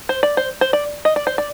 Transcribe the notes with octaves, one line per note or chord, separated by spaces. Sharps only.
C5
D5
C5
C5
D5
D#5
D5
C5
D5